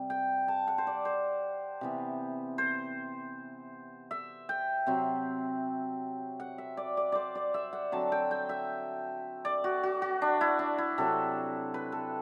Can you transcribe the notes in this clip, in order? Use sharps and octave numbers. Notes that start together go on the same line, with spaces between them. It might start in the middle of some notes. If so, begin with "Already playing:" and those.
Already playing: C3 G3
G5
A5
F#5
C5
D5
C5
C3 E3 B3
C5
E5
G5
C3 F#3 C4
F#5
E5
D5
D5
C5 D5
D5
E5
F#5
D3 F#3 C4 A5
G5
G5
E5
D5
F#4
F#4
F#4
D4
E4
D4
E4
C3 F#3 C4 A4
B4
A4